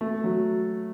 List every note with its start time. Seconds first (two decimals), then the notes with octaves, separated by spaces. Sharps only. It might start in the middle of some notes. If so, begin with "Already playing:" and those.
0.01 A3
0.24 F#3